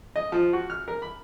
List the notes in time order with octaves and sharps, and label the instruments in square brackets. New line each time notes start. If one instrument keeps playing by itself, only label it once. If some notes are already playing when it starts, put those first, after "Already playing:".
[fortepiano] D#5
F3
F#4
F6
A#4
B5